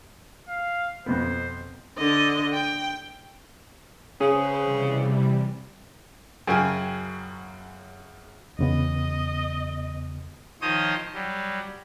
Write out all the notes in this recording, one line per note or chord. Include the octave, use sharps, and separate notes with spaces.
F5
F2 B2 B3 C5
D3 D#5
G5
C#3 C#4 G#4 B4 C5
C3 E3 G3
F#2 C#3 F#3 G5 G#5 F6
E2 C#3 B3 D#5
D#3 F3 C5 C#5 D#5 D#6
F#3 G3